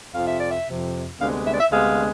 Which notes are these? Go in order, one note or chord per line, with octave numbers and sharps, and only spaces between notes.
F2 C3 F3 F5
E5
D5
E5
F2 C3 F3
D2 C3 G#3 B3 D4 F5
E5
D5
E5
D2 C3 G#3 B3 D4 F5